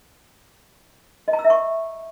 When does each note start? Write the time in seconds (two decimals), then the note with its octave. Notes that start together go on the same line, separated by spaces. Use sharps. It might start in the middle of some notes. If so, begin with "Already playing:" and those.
1.28 D#5
1.33 A#5
1.39 E6
1.44 E5
1.50 C#6